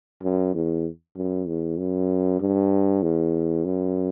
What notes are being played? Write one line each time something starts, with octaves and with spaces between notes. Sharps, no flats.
F#2
E2
F#2
E2
F#2
G2
E2
F#2